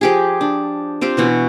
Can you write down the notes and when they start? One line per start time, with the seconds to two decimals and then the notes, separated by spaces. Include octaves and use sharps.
0.01 F3 G4 G#4
0.41 D4
1.01 C4 F4 G4 C5
1.17 B2 E3 F#4